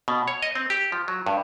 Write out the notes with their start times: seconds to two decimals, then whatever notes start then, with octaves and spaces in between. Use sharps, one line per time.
0.08 B2
0.28 C#5
0.42 D#5
0.55 C4
0.70 G4
0.92 F3
1.08 F#3
1.26 G2